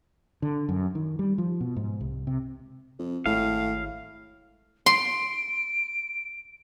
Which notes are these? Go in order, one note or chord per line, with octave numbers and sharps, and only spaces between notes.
D3
F#2
D#3
G3
F3
B2
G#2
C2
C3
F2
G#1 A2 G#3 F5
C6 D7